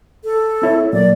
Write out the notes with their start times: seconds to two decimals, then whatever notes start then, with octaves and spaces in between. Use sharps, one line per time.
0.24 A4
0.62 C4 E4 C#5
0.93 A#2 F#3 A#3 D5